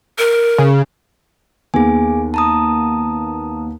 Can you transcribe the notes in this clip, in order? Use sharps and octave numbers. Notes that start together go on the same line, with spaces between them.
A#4
C#3
D#2 B3 G#4 G#5
A5 A#5 D#6